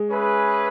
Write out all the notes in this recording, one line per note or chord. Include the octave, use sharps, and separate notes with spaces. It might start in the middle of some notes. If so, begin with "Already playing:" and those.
Already playing: G#3
C#4 G#4 B4 E5